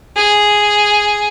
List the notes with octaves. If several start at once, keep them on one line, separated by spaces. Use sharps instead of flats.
G#4